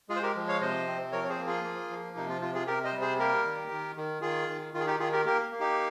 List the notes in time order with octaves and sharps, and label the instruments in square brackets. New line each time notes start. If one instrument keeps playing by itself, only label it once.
[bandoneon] G#3 F4 G#4
C5
G4 A#4
F3
C#5 F5
C3 C5 D#5
C4
F3 A#4 C#5
C#5
G#4 C5
A#3
F4 G#4
A#3
F3
C3 D#4
F4
C3 F4
F4 G#4
C3 G4 A#4
C5 D#5
G3
G#4 C5
A#3 G4 A#4
D#3
D#3
D#3
D#3 F4 G#4
D#3
D#3 F4
G#4
D#4 G4
D#3 F4 G#4
G4 A#4
A#3 G4 A#4
A#3
D#4 G4